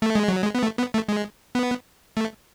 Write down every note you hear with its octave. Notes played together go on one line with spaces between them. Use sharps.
A3
G#3
F#3
G#3
B3
A3
B3
A3
G#3
B3
A3